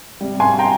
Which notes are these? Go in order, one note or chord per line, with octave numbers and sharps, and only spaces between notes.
C3 G3
G#5 C6
G5 A#5